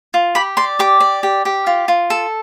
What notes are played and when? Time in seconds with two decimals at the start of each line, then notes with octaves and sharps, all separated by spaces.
0.14 F4
0.35 G4 B5
0.57 D5 C6
0.79 G4 D6
1.00 D5
1.23 G4
1.45 G4
1.67 F4
1.88 F4
2.10 A4